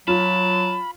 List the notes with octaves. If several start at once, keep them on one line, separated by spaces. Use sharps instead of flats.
F#3 F4 A5 B5